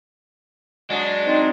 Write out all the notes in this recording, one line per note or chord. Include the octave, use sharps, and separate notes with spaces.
F#3 G#3 D4
C4 D#4 C5